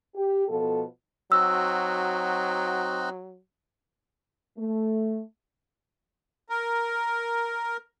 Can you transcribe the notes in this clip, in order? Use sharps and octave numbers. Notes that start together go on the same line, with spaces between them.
G4
B2 F3 B3 F4 A4
F#3 C4 D#4 F#4 E6
A3
A#4